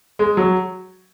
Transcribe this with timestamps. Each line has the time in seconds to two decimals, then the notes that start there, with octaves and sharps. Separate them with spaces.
0.19 G#3
0.37 F#3